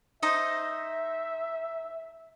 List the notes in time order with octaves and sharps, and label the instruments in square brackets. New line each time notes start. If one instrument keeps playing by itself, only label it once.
[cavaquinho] D#4 C5 D#5 [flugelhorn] E5